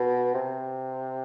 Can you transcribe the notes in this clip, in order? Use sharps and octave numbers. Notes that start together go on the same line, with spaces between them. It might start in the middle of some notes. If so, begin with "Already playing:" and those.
Already playing: B2
C3